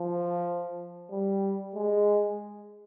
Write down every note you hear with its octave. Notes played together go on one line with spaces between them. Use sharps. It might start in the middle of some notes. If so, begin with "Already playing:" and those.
Already playing: F3
G3
G#3